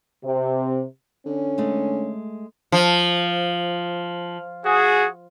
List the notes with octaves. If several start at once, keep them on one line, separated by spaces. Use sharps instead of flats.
C3
D3 C#4
G#3 A3
F3
F#4 G#4